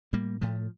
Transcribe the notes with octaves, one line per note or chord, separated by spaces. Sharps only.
A2 G3 A#3
A2 F3 A3